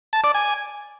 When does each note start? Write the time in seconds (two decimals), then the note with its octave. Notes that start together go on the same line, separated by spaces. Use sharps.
0.13 A5
0.24 D5
0.34 G#5